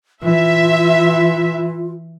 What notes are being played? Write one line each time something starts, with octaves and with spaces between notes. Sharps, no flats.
E3 F4 E5